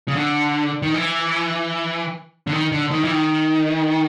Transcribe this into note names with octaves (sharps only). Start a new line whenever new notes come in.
C#3
D3
D#3
E3
D3
D#3
D3
D#3
E3
D#3